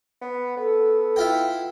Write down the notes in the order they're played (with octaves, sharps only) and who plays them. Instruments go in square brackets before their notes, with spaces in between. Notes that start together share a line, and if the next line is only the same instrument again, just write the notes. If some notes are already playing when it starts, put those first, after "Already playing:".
[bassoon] B3
[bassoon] B3 [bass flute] A4
[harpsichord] E4 F4 G5